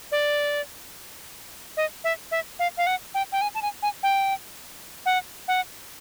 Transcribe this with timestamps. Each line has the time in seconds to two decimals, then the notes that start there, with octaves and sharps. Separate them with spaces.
0.12 D5
1.77 D#5
2.04 E5
2.31 E5
2.59 F5
2.77 F5
2.87 F#5
3.14 G5
3.32 G5
3.41 G#5
3.55 A5
3.62 G#5
3.82 G#5
4.03 G5
5.06 F#5
5.48 F#5